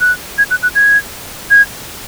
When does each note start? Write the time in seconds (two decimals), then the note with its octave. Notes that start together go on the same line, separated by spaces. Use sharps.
0.01 F#6
0.38 G#6
0.51 F#6
0.63 F#6
0.75 G#6
1.51 G#6